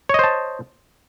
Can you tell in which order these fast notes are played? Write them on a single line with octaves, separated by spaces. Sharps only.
C#5 D#5 C5 A5